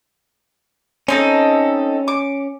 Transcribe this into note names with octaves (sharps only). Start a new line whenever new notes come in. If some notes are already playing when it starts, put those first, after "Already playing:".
C4 C#4 D#4 A4
D6